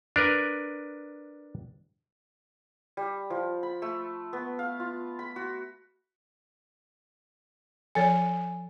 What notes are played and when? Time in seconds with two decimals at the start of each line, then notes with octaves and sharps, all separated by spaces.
0.16 D4 A#4 B4
2.97 G3
3.30 F3
3.63 B5
3.82 A3
4.33 B3
4.59 F5
4.80 F4
5.19 B5
5.36 F#4
7.95 F3 A4 C#5 G#5 A6